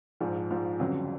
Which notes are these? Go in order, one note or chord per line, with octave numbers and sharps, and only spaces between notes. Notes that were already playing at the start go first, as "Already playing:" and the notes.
A#1 G#2 F3
A#1 G#2 F3
G1 F2 C#3 F#3